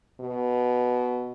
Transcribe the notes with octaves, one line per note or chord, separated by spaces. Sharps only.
B2